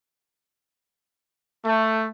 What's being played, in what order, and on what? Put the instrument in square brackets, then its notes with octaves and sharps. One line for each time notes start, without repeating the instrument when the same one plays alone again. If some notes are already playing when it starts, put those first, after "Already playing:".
[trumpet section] A3